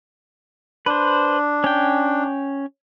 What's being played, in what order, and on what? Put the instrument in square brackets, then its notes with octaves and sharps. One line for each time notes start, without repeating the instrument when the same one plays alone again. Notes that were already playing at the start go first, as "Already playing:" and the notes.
[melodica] D4 [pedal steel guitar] B4 C5
[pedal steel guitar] C#4 G5